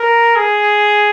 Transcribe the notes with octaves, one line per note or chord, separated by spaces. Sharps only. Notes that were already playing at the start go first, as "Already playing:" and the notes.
Already playing: A#4
G#4